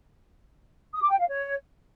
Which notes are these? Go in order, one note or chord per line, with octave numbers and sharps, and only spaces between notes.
D#6
D6
G5
F5
C#5